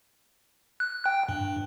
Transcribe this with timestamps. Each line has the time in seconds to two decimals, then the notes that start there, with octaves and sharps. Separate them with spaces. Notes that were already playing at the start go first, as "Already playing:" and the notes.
0.80 F#6
1.06 G5
1.29 G2